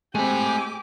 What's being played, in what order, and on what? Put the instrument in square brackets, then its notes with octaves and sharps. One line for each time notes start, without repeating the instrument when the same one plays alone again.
[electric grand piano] G#3 C4 [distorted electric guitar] A3 B5 [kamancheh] G4 D6 [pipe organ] G#5